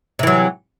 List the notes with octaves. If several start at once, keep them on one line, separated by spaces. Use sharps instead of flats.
C3 E3 F#3